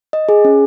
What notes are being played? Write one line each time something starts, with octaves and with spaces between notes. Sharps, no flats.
D#5
G#4
C#4